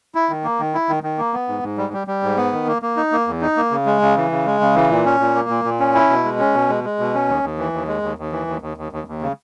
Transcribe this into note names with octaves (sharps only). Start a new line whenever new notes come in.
E4
D#3
A#3
D#3
E4
D#3
D#3
A#3
B3
G#2
G#2
G3
G3
G3
G#2
B3
D#3
A#3
A#3
D#4
A#3
E2
D#4
A#3
C#3
G#3
C#3
E3
C#3
G#3
C#3
E3
A#2
C#4
A#2
A#3
A#2
A#2
C#4
E4
B2
G#3
C#4
B2
G#3
G#3
B2
C#4
D#2
D#2
E3
D#2
G#3
D#2
D#2
E3
D#2
D#2
D#2
D#2
D#2
C#3